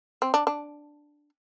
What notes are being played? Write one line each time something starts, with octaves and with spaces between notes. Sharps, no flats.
C4
D4
D4